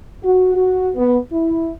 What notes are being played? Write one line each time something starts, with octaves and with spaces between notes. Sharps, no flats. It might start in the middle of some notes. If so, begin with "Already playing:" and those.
F#4
F#4
B3
E4